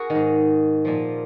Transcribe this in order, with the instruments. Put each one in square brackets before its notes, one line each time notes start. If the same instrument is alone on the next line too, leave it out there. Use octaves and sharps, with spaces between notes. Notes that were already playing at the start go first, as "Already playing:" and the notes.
Already playing: [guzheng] F#4 G#4 A#4
D#3
G#2
A#2 F3